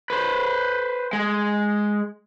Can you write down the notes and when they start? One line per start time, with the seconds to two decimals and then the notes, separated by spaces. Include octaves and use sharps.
0.10 B4 C5
1.13 G#3